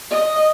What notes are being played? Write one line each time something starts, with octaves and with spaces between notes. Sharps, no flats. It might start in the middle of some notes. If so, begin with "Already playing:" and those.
D#5